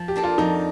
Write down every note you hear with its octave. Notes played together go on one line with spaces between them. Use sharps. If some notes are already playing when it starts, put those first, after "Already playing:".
Already playing: F3
G4
A#3 D4 A4
F4
F2 D#4